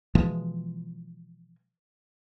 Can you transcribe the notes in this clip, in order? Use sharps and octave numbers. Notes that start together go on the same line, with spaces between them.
B2 E3 F3 G#3